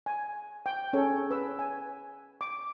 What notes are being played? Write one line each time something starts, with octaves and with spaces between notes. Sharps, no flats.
G#5
G5
C#4 G#4 A4 C#5
B4 E6
G#5
D6